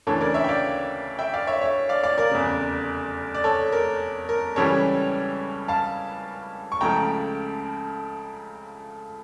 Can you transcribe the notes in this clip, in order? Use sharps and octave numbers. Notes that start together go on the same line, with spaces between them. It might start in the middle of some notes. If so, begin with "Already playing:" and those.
D2 C#3 E3 A#3 D4 A4 C#5
A#4 D5
C#5 E5
G5
D5 F5
E5 G5
D5 F5
C#5 E5
C#5 E5
D5 F5
D5 F5
A#4 D5
F1 E2 C#3
D5
A4 C#5
A#4
A#4
C#2 C#3 E3 G3 C#4 A4 C#5
F5 A5
C#6
C#2 C#3 F3 A3 E4 G5 A#5